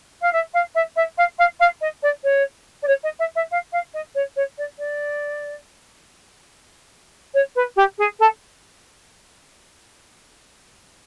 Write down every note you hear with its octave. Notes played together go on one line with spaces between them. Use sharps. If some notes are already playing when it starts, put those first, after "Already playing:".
F5
E5
F5
E5
E5
F5
F5
F5
D#5
D5
C#5
D5
C#5
D#5
E5
E5
F5
F5
D#5
C#5
C#5
D5
D5
C#5
B4
G4
G#4
A4